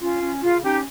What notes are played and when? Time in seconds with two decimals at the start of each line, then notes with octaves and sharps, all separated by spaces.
0.01 C#4 F4
0.21 C#4
0.42 C#3 F4
0.63 C#4 D#4 G4